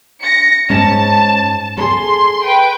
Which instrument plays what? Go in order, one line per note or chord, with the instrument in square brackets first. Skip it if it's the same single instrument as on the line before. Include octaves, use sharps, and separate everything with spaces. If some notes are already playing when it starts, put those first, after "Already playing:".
[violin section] A#6 C#7
[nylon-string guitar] G#2 C#4 [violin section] A5
[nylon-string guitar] G#4 A4 [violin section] C6
[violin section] B4 G5